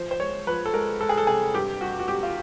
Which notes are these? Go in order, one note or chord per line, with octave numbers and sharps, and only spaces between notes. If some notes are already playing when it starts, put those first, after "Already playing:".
Already playing: F3 C5
C5
G#3 C#5
F3 B4
A4
G#3 A#4
G#3 A4
G#4
A4
C3 G#4
G2 G4
G2 F#4
F#4
G#1 G4
F4